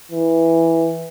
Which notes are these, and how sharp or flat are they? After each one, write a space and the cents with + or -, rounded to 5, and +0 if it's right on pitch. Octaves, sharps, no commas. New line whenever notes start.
E3 +0